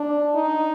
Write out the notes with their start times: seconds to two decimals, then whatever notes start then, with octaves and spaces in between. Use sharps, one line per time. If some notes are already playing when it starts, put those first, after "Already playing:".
Already playing: D4
0.35 D#4